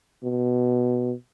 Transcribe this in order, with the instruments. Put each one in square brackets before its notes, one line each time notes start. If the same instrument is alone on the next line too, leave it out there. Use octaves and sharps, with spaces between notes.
[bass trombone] B2